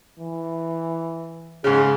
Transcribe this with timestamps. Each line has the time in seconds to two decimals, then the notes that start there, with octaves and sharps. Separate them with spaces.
0.20 E3
1.64 G#2 C#3 G#4